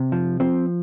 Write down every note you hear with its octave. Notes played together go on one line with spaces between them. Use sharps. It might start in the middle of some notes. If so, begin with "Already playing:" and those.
Already playing: C3
F3
F3 C4